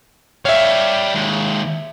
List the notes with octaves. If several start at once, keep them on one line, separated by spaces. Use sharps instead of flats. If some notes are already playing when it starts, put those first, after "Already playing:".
G3 C#5 E5 F5
D#2 G#3